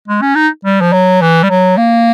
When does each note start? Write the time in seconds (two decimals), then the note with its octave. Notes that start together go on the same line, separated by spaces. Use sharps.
0.08 G#3
0.22 C#4
0.35 D#4
0.65 G3
0.81 F3
0.93 F#3
1.22 E3
1.43 G3
1.50 F#3
1.77 A#3